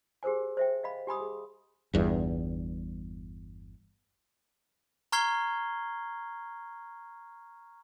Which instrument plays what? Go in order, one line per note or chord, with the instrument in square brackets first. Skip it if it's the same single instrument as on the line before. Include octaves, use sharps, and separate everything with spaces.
[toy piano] G4 G#4 A#4 C5 G#5
C5 E5 G5
D#5 F5 B5
G4 G#5 B5 D#6
G#4
[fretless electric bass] G1 E2 G2
[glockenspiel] A#5 C#6 F6 G#6 C7 G7